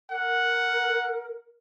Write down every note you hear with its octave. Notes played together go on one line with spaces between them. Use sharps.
A#4 F#5